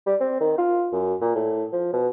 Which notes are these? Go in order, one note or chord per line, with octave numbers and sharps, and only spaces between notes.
G3
C4
D#3
F4
F#2
A#2
A2
F3
B2